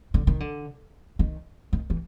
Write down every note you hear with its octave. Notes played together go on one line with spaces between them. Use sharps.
D3
D#3
D3
D#3
D#3
E3